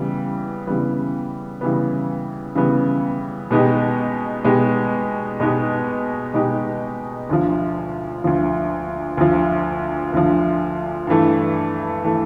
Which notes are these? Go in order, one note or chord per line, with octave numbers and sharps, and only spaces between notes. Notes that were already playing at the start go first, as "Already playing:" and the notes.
Already playing: C#3 E3 G3 B3
C#3 E3 G3 B3
C#3 E3 G3 B3
C#3 E3 G3 B3
B2 G#3 B3 D#4 G4
B2 G#3 B3 D#4 G4
B2 G#3 B3 D#4 G4
B2 G#3 B3 D#4 G4
D2 D3 F3
D2 D3 F3
D2 D3 F3
D2 D3 F3
G2 E3 A3
E3 A3